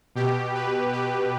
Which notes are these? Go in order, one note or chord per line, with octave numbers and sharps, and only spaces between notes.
B2 G4
B4
G4